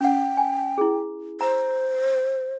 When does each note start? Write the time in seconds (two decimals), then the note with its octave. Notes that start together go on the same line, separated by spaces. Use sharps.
0.01 C#4 F#5 G5
0.37 G#5
0.78 E4 G#4
1.41 C5 A#5